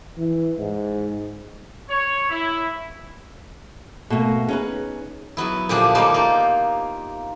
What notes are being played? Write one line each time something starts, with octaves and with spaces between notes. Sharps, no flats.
E3
G#2
C#5
E4
B2 A3 A#3
C#4 D#4 G#4 B4
F#3 B3 E4
A#2 D3 F3 D4 G4 G#4
G3 A3 A#3 D#4 C5
A#3 F4